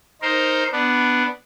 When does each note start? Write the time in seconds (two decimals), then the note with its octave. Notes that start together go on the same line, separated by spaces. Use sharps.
0.22 D#4 A#4 C5
0.72 B3 D4